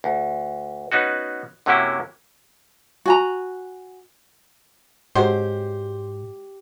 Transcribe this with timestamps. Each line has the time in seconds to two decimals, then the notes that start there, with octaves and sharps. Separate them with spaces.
0.04 D2
0.92 B3 C#4 D#4 F#4
1.66 F#2 C3 F#3 A#3 C#4 E4
3.06 F#4 G#5 A#5
5.15 G#2 F#3 G#3 C4 G4 C5